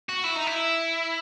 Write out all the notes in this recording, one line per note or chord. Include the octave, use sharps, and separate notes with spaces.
F#4
E4
D#4
E4